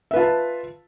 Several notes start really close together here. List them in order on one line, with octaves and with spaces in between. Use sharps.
E5 B4 F4 A5